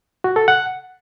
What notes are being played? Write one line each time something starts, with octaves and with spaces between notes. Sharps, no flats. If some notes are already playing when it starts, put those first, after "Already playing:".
F#4
A4
F#5